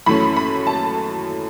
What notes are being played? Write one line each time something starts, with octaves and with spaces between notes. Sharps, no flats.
F#2 E3 A3 C#4 B5
B5
A5